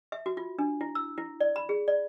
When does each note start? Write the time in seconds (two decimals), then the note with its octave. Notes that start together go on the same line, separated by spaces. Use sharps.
0.12 E5
0.26 F#4
0.37 F4
0.59 D4
0.81 E4
0.95 E6
1.18 E4
1.40 D5
1.56 B5
1.69 G#4
1.88 D5